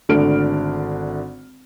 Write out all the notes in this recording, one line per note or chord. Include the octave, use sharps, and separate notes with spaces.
G#1 D3 A3 D4 F6 D7